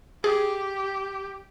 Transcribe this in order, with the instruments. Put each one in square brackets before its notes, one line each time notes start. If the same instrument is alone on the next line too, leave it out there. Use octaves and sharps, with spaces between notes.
[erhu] G4 [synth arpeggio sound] G#4